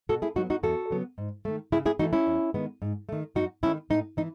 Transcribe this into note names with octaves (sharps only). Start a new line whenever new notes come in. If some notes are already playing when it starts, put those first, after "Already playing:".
B2 F#4 A4
E4 G#4
F#3 B3 D#4 F#4
D#4 F#4
E2 F#4 A4
C#3 F#3 B3
G#2
D#3 A3
C#3 E4 G#4
E4 G#4
E3 A3 D#4 F#4
C#4 E4
E2
D#3 G#3 B3
G#2
D#3 A3
F#2 D#4 F#4
D#3 A3 C#4 E4
A2 D#4
E3 D#4